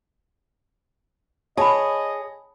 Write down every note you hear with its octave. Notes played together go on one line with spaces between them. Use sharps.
G#4 C#5 D#5 A5 B5